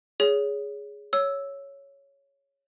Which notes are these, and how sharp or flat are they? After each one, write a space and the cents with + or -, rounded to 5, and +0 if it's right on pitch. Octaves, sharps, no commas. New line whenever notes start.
G#4 +0 C#5 +20
C#5 +0 E6 +0